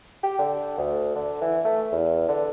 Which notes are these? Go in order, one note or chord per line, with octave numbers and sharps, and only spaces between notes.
G4
D3
D2
D3
E3
A3
E2
D3